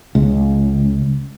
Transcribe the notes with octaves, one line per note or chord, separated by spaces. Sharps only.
C#2